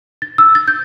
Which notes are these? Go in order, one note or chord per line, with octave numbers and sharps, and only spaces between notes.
A6
E6
A6
G6